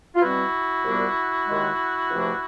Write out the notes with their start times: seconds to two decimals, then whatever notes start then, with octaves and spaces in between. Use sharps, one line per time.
0.15 F4
0.21 B2 G3 C4 E4 F#4
0.85 C2 A#2 G3 B3 D4
1.47 D#2 D#3 G#3
2.10 C#2 C3 F3 A3 D4